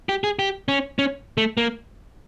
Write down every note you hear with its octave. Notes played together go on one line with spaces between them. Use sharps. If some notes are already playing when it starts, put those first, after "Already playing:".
G4
G#4
G4
C#4
C#4
A3
A#3